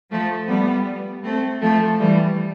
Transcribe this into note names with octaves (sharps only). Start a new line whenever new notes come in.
F3 A3
G3 B3
A3 C4
F3 A3
E3 G3